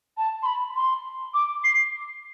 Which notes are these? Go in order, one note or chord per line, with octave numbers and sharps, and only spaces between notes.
A5
C6
B5
C6
D6
C7